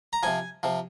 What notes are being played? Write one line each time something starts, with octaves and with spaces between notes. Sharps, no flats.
A#5
C3 F3 G#5
C3 F3